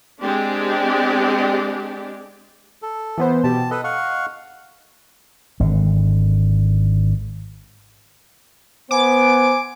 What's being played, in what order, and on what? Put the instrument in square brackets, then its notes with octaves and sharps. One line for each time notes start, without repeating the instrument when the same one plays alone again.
[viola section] G#3 C4 D4 G4 D5
[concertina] A4
[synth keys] E3 B3 C5
[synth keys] B2 G4 [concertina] A5
[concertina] A4 B4 [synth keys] D#5
[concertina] F5 F#5 C#6
[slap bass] G#1 D3
[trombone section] B3 [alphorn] C5 [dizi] G#5 [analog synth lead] D6